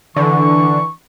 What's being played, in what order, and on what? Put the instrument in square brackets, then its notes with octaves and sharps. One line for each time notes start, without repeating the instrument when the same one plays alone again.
[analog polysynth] D3 [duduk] E3 [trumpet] C#6